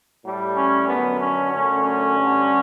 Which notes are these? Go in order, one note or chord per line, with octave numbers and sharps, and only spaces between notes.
A2 G3
C#4
F#2 D3 F#3 B3
C#4
F#2 D3 A3 C#4
C#4
G2 D3 G3